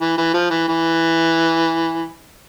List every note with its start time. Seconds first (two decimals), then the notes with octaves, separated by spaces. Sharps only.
0.01 E3
0.18 E3
0.34 F3
0.50 E3
0.68 E3